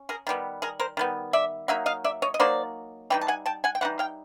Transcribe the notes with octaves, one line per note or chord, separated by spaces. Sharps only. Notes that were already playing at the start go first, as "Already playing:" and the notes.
Already playing: C#4
G#4 A#4
D#3 G3 B3
G#4 A#4
A#4 C5
D#3 G3 B3
D5 E5
F#3 A#3 D#4 E5
D#5 F5
D5 E5
C#5 D#5
D#5
F#3 A#3 D#4 C5 D5
E3 G3 D#4 G5
A5
F#5 G#5
G5 A5
F#5 G#5
G5
E3 G3 D#4 F#5
F5 G5